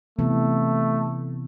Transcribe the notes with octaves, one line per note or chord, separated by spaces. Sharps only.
C3 E3 A3 B3